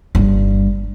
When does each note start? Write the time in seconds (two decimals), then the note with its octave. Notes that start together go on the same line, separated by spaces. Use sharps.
0.15 G1 G2